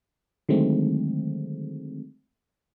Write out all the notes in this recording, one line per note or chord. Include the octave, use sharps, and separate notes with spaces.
D3 D#3 F#3 G#3 A3 C4